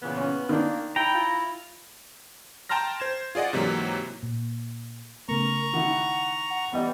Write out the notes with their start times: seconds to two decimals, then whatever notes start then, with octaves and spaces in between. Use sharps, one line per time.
0.02 A#2 C#3 E3 B3
0.18 C#4
0.49 D#3 A#3 D4
0.96 E4 G5 A#5
1.14 F4
2.69 G5 A5 A#5 C6 F6 A#6
3.00 C5 G#6 E7
3.35 F4 G#4 D5 D#5 F#5
3.53 G#2 C3 E3 F#3 A#3
4.23 A#2
5.29 C#3 A3 B3 A#4 A#5 C#6
5.73 D#3 E4 F#5
6.50 F#5
6.73 E3 G3 B3 D#5